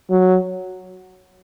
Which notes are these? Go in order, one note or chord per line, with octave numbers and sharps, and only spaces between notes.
F#3